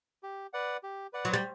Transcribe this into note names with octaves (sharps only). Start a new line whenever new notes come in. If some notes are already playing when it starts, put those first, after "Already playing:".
G4
B4 D5 F#5
G4
B4 D5 F#5
F#3
G3